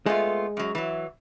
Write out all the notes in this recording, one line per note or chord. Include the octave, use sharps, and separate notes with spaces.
G#3 A3 B3 F4
F#2 F#3
E3 F#3